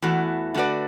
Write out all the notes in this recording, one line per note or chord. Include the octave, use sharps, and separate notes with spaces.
E2 E3 A3 F#4
D3 A3 F#4 B4 D5